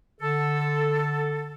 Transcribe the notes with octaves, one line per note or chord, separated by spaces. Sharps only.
D3 A4